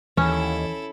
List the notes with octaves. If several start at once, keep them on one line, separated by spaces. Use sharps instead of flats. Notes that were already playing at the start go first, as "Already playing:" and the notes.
D#2 E3 C#4 E4 A4